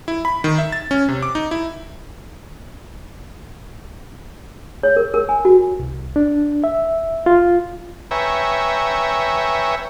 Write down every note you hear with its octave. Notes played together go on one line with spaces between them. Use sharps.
E4
B5
D#3
E5
A6
C#4
C3
D6
D#4
E4
C#5
A#4
A#4
G#5
F#4
C2
D4
E5
F4
B4 C#5 E5 G5 G#5 A#5